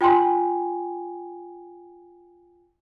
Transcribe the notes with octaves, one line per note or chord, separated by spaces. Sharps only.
F4 G5 G#5 C6